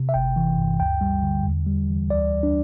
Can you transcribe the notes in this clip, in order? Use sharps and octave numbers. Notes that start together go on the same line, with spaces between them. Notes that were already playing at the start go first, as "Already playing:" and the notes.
Already playing: C3
E5
G1 G5
E3
G2
D2 G5
G3
D3
E2
G3
E3
D2 D5
G3
D4